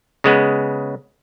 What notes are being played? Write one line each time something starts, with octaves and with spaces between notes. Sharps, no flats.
C#3 G#3 B3